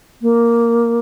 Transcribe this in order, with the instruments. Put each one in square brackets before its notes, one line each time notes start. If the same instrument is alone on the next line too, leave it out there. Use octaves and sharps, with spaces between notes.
[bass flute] A#3